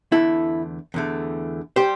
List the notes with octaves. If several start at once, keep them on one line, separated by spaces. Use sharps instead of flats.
E2 D3 A3 E4 A4
E2 D3 A3
G3 G4 C5